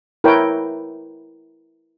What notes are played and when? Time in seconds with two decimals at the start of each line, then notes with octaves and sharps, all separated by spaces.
0.24 E4 A#4 B4 C#5 G5